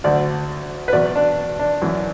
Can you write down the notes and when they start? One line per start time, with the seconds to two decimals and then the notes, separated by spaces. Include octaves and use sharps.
0.04 D2 D3 F#3 D5
0.88 B4
0.93 E2 B2 F#3 D5
1.16 D4
1.59 D4
1.82 F#2 E3